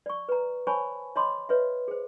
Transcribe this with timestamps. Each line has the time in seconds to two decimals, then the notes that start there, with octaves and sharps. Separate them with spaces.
0.06 D5 C#6
0.29 B4 A#5
0.67 C5 C#5 G#5 A5 B5 C#6
1.16 C#5 D#5 A5 B5 C6 D6
1.49 B4 C#5 D#5 E5
1.88 G#4 C5